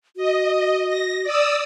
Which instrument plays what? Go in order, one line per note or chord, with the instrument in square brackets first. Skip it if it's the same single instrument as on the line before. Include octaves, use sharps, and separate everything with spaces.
[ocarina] F#4 [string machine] D#5
[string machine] A#6
D5 D#6 E6